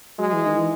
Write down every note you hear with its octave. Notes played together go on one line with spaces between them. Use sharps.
F#3 G#3
E3
D#3
E3